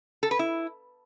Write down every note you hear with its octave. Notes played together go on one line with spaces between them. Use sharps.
A4
B4
E4